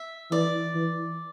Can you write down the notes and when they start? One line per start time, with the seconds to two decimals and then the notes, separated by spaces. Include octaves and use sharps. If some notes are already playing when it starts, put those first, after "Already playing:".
Already playing: E5
0.31 E3 D5
0.75 E3